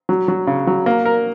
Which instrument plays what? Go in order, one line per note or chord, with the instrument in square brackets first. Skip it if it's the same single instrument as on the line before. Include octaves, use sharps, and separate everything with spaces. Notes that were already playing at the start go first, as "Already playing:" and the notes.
[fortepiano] F#3
F#3
C#3
F#3
A#3
A#4